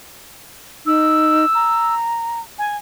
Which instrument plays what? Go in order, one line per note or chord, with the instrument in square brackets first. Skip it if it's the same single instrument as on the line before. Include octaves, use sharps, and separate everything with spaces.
[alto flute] D#4 [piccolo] E6
[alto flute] A#5
[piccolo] G#5